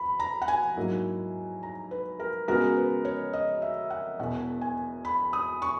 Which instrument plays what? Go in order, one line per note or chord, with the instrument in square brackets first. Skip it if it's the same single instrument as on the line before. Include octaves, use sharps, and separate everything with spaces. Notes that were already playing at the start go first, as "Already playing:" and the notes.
Already playing: [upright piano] E2 [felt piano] B5
[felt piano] A#5
F#5
G#5
[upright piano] G#2 F#3 A#3 E4
[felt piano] A#5
B4
A#4
[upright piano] C#3 G#3 B3 F#4 [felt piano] A#4
[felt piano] B4
C#5
D#5
E5
F#5
[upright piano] E1 E2 B2 [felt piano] F#5
[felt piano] G#5
B5
D#6
C#6